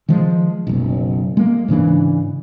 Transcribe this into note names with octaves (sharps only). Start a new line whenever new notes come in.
D#3 F3 G#3
F#1 B1
G#3 A#3
G#2 C#3 E3 D4